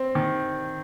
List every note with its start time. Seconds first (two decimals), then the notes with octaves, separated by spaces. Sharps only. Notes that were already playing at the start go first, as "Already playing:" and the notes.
Already playing: C4
0.15 D#3